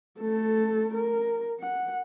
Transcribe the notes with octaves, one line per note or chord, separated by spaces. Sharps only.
A3 A4
A#4
F#5